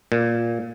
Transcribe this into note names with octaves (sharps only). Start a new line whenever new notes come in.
A#2